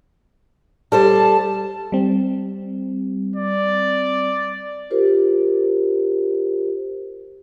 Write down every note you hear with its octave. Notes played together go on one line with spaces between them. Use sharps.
G3 A4 C5 A5
G3 C4
D5
F4 G4 A#4 C5